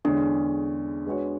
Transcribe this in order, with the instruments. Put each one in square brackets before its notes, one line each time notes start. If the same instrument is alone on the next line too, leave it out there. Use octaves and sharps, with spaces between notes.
[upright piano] E2 D3 G#3 C#4 [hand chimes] D4
[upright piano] G#3 B3 F#4 C#5